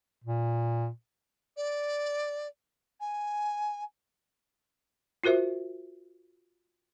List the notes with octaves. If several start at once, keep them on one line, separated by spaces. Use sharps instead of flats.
A#2
D5
G#5
F4 F#4 A#4 C5 E5